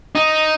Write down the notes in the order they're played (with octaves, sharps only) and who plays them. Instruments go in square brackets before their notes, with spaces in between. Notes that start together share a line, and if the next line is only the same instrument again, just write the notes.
[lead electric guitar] D#4